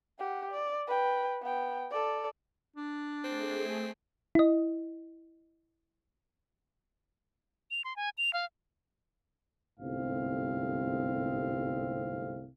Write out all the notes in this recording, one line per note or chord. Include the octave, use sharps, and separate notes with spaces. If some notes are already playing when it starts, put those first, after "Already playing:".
G4 F#5
D5
B4 G5
B3 G5
A4 D5
D4
A3 C4 G#4
E4 D#5
F7
C6
G#5
F7
F5
G1 C2 G#2 A3 C4 F5